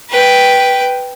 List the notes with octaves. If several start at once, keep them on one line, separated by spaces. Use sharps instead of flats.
B4 G5